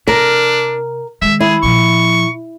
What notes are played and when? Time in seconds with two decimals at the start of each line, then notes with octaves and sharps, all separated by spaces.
0.08 C3 D4 A#4
1.22 D#3 G#3 E5
1.40 E4 G#4
1.63 A#2 F3 C#6